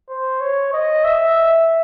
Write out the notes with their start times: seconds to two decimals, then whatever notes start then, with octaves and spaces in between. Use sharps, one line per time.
0.09 C5
0.41 C#5
0.73 D#5
1.04 E5